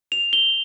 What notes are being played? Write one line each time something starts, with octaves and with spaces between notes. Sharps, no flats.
F7
G7